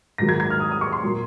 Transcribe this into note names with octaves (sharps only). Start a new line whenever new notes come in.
G#2 D#3 F#3 A#3 A#6
G#6
G#6
F6
D#6
D#6
C#6
C6
A#2 F#3 A#3